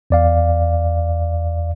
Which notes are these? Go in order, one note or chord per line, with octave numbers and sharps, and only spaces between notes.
E2 D5 F5